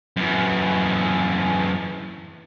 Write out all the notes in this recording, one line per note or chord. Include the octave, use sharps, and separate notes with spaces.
F#2 E3